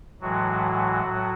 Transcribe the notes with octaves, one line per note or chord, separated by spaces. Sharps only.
A2 E3 F#3 G#3 F#4
A2 F#3